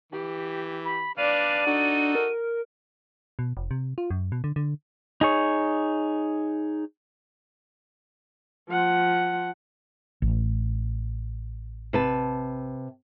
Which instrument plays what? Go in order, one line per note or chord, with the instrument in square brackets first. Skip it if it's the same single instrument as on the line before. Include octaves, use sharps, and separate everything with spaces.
[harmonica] E3 [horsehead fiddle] G4
[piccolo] B5
[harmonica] D4 B4 F5 [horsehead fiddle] D5 [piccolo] D#7
[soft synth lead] D4 [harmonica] D#4 F#4 A4
[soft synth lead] A#4
[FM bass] B2
F1
C3
F4
F#2
B2
D3
D3
[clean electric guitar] D#4 G#4 C#5
[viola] F3 F#5
[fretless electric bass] A1
[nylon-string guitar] C3 B4 A5